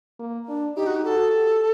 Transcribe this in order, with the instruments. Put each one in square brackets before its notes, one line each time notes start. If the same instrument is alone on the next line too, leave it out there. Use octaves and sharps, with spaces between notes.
[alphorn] A#3
D4
[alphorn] D#4 [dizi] G4
[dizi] F#4
G4
[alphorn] F#4 [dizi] A4
[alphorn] G4